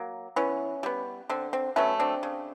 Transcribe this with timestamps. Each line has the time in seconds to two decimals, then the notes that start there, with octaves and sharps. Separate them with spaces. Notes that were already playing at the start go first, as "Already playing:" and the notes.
Already playing: F#3 A#3
0.36 E3 B3 C#4
0.83 G3 B3
1.29 D3 C4
1.53 C4
1.76 F#3 A3 B3 C#4
2.00 C4 D4
2.23 C#3